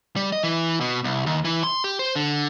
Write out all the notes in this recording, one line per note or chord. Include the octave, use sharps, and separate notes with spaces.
G3
D#5
E3
B2
C2
D#2
E3
C6
G4
C5
D3